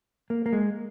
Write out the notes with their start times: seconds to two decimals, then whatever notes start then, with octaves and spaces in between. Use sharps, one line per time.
0.30 A#3
0.46 A#3
0.53 G#3